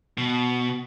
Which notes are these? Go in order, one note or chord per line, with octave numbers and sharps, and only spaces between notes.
B2